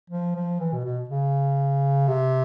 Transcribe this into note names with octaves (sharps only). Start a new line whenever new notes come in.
F3
F3
E3
B2
B2
C#3
C3